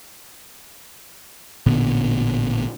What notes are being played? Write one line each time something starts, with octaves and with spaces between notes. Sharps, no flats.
A1 A#2 D3 B3